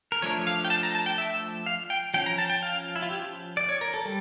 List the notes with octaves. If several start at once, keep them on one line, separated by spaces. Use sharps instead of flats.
A#4
F3 A3 D4 C#5
F5
G5
A5
A#5
A5
G5
E5
F5
G5
F3 C#4 G5
A#5
A5
G5
F5
E4
F4
G4
D5
C#5
A#4
A4
G3